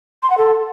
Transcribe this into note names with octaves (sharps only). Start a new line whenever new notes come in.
C6
F#5
A4